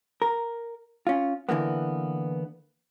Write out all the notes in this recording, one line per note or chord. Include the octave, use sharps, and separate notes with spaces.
A#4
C#4 F4
D3 E3 A#3 B3